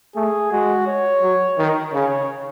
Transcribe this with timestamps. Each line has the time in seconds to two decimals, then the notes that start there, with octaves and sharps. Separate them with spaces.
0.15 A3 G#4
0.51 G#3 F#4
0.87 C#5
1.22 F#3
1.58 D#3
1.93 C#3 C#5